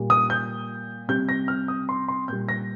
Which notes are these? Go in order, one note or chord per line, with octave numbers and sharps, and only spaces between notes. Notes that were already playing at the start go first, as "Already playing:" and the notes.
Already playing: A#2 G3
D#6
G6
C3 G3 G6
A#6
F6
D#6
C6
C6
A#2 G3 G6
A#6